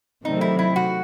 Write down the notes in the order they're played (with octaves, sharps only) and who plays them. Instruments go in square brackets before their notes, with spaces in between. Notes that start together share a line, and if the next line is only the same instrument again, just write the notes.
[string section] C3 D#3 F#3 A3 C4 [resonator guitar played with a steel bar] D#4
[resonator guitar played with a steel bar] E4
E4
F#4